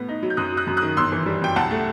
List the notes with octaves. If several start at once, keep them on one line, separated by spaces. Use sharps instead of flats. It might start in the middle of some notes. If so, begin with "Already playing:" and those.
Already playing: A2 B3
D#4
F#3
G6
F#2 D#6 F#6
F#3
D#6 F#6
F#2
D#3 D#6 F#6
G1 C6 E6
E3
G3
F#2 G5
C2 F#5 A5
A3